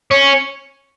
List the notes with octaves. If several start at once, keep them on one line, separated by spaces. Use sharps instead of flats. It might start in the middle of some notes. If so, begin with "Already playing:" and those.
C#4